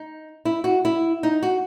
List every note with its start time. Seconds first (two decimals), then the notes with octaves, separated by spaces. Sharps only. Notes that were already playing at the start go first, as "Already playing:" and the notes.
Already playing: D#4
0.45 E4
0.64 F#4
0.85 E4
1.23 D#4
1.43 F#4